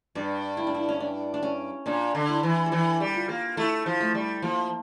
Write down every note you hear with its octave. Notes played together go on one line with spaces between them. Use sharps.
G2 D5
E4
D4
E4
C#4
D4
D4
C#4
A#2 D4
D3
E4
E3
A4
E3 G4
G3
F4
A#3
A3 E4
F3
A3
G3
F3 A#3